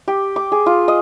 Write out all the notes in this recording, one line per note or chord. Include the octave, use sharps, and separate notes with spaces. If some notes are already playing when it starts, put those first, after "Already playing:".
G4
D6
G#4
F4
D#5